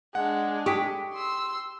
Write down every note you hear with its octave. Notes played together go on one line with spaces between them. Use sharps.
G#3 D4 F#5
G4 C#6 D#6 B6
C6 E6